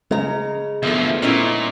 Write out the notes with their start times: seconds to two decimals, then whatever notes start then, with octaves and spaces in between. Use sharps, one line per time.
0.11 C#3 G#3 A#5
0.83 D2 D#3 F3 A3 B3 A4 E5
1.22 A#2 C#4 D#4 E4